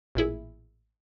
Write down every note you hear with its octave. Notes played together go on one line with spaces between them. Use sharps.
A1 A#2 E4 G#4